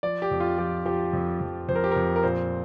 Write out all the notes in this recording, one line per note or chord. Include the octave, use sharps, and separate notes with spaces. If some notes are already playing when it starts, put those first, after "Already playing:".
F3 D5
G4
F2
F4
F3 G4
F3 G4
F2
F2
F2 C5
A#4
G4
F2 A#4
A#4
A#2 C5